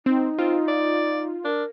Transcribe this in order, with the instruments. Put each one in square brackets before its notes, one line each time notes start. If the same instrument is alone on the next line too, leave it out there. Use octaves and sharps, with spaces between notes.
[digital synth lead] C4 [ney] D#4
[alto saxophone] C4 [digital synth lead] F4
[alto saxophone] D5
[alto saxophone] D4 [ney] A#4